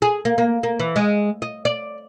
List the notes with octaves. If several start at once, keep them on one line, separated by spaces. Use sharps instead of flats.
G#4
A#3
A#3
A#3
E3
G#3
D#5
D5